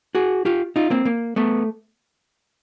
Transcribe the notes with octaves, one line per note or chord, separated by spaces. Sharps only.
F#4 G#4
F4 G4
D#4 F4
A#3 C4
A#3
A3 B3